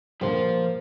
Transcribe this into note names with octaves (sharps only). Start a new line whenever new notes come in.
A#2 D3 F3 G3 A#3 C5 C6